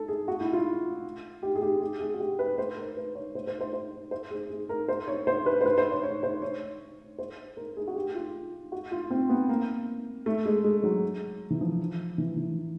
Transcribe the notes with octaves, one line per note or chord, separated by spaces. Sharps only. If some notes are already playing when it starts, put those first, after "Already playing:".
Already playing: A4
G#4
F#4
E4
F4
G4
G#4
G4
G#4
G#4
F#4
G4
B4
C5
A#4
B4
C#5
C5
C5
C5
C5
C5
G#4
G#4
A#4
C5
C#5
C5
B4
C5
B4
C5
C#5
C#5
C5
C#5
C5
A#4
G#4
F#4
G4
F4
F#4
F4
C4
B3
A#3
A3
G#3
G#3
F#3
E3
F3
E3
E3